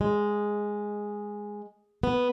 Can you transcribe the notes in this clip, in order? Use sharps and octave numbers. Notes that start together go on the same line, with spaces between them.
G#3
B3